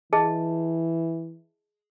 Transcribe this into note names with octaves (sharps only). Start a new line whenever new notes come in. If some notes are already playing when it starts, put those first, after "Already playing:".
E3 G#4 D#5 A5